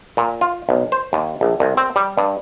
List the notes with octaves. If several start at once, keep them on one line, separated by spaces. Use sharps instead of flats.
A#2
F4
B1
C5
D#2
A#1
C2
C4
G3
G2